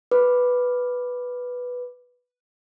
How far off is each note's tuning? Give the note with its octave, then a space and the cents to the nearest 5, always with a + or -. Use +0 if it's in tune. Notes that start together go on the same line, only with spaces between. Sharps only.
B4 +0 D6 +0